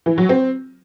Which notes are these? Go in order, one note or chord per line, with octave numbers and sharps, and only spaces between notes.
E3
F#3
C4